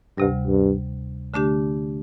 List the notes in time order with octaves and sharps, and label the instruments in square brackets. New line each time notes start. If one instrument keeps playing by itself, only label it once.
[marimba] D2 C3 G3 [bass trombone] G2
[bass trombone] G2
[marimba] D3 A3 D4 G4